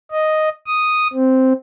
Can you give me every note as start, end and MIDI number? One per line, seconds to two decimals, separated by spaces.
0.11 0.49 75
0.66 1.07 87
1.13 1.53 60